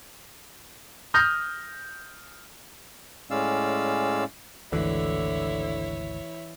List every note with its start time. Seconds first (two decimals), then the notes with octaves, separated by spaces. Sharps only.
1.14 D#6 F6 G6 A#6
3.31 A2 G#3 C#4 D5 F5 E6
4.72 G#1 D2 D3 E3 E4 C#5